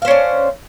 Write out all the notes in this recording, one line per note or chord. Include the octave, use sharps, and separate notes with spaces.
C#4 D4 C5 F5